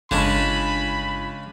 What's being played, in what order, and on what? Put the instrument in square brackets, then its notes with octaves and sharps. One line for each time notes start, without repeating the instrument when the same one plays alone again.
[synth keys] G1 [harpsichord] C#3 G#3 D4 [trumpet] B5